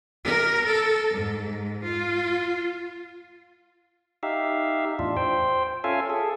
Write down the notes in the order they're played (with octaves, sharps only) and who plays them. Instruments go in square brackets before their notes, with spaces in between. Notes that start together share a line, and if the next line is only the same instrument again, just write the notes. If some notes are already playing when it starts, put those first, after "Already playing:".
[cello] A#4
A4
G#2
F4
[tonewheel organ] D#4 G4 E5 F5
E2 A2 D4 F4
C5 G5
C#4 F4 A4 E5 F5 G#5
G#4 A4